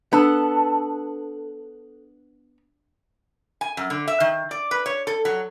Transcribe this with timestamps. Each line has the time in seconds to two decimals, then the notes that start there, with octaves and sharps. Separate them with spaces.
0.13 B3 D4 A4 F#6
3.61 G#5
3.77 F#2
3.90 D3
4.08 E5
4.20 D#3
4.51 D5
4.71 B4
4.86 C#5
5.07 A4
5.25 F#3